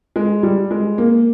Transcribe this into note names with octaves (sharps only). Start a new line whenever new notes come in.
G#3
G3
G#3
A#3